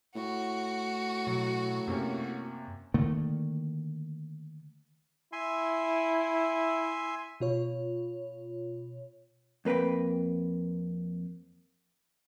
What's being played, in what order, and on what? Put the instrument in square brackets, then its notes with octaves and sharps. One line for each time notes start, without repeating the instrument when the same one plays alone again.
[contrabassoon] A2 [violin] F#4
[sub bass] B2 [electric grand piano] F#3
[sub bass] F#2 [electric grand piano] C3 A#3 C#4
[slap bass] D3 D#3 A3 A#3
[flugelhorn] E4 [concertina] E5 G#5 C6
[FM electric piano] B2 F4 C#5
[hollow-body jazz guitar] F2 A#3 B4 G5 B5